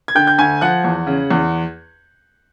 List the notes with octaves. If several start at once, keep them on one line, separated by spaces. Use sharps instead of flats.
G#6
D3 G5 G6
G6
D2 G#5 G#6
F3 F#5 F#6
E2
C#3
E2